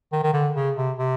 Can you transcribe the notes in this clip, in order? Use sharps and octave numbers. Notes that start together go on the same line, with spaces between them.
D#3
D#3
D3
C#3
C3
C3